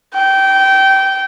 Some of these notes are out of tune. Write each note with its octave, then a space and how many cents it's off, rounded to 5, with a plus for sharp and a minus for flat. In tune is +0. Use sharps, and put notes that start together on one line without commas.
G5 -20